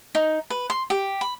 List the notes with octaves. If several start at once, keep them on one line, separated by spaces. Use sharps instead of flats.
D#4
B4
C6
G4
B5